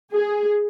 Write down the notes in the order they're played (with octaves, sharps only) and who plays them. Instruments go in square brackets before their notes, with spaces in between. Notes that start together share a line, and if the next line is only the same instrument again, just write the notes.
[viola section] G#4